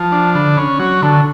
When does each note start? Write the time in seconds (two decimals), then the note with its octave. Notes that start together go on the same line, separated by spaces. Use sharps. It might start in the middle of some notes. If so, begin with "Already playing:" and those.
Already playing: F3 A5
0.12 D4
0.35 D3 B5
0.57 C#4 C#6
0.79 F#3 C#6
1.02 D3 A5